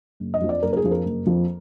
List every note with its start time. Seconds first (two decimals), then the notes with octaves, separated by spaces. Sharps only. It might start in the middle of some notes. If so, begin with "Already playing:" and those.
0.20 F#1
0.34 D#5
0.41 F2 F3
0.49 D5
0.63 F#1 A#4
0.73 A#4
0.77 G#4
0.84 F2 F3
0.91 A#4
1.05 F#1
1.26 F2 F3